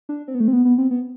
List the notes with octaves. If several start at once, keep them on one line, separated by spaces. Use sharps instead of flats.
D4
C4
B3
A3
C4
B3
B3
C4
B3